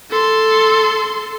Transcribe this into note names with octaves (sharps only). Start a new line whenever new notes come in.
A4 C6